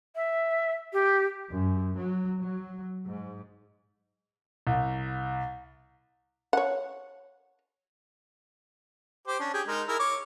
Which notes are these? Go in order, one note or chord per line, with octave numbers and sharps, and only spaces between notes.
E5
G4
F#2
F#3
F#3
G#2
C2
C#5 F#5
G4 C5 D6
C#4 D4
G4 G#4
G#3 D#4 A#4
E4 G#4 A#4
C#5 C#6 D6